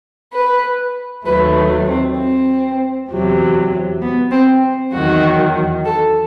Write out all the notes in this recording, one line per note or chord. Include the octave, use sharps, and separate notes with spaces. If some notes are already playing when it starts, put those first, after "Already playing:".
B4
D#2 D#3 F#3 A3 B4
C4
C4
E2 C3 F#3
B3
C4
E2 D#3 F#3 F#4
A4